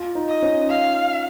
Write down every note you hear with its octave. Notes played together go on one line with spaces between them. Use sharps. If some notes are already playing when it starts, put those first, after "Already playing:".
Already playing: F4
D#4
D#5
C#4
F5